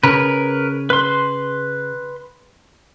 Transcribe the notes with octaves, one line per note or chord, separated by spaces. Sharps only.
C#3 A#4 B4
B4 C6